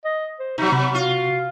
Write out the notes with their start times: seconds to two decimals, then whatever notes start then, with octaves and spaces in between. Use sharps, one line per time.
0.05 D#5
0.39 C5
0.58 B2 F#3 D#4
0.72 C3 B5
0.95 F4 F#4